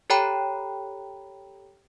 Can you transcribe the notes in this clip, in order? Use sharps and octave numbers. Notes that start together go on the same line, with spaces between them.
G4 A4 C#5 G5 A#5 B5